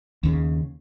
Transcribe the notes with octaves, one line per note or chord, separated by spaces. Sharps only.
D#2 C#3